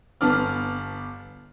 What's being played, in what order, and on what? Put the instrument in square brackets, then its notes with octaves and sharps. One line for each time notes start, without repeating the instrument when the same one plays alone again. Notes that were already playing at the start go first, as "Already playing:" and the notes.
[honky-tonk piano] G1 B3 D4 D6 F6